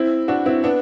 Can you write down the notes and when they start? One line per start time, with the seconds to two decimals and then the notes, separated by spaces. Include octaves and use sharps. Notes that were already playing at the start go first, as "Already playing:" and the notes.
Already playing: C4 E4
0.28 D4 F#4
0.46 C4 E4
0.64 B3 D4